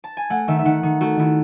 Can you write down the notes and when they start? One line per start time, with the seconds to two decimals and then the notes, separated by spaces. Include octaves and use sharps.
0.04 A5
0.17 G#5
0.30 A3 F#5
0.48 D#3 E5
0.59 E5
0.65 D#3 F#5
0.83 D#3
1.01 A3 F#4
1.19 D#3 E4